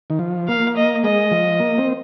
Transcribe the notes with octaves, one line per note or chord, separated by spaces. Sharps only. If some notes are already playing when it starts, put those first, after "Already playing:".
D#3
F3
A#3 F5
D#5
G#3 D#5
F3
A#3
C4